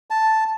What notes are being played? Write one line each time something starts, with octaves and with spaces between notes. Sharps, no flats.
A5